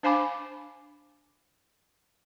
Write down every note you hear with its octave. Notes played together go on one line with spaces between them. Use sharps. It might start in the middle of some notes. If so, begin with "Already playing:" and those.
D4 C5 F5 G#5 B5 D6